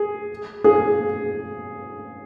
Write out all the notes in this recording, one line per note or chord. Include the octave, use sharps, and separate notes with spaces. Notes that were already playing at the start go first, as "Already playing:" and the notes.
Already playing: G#4
G#4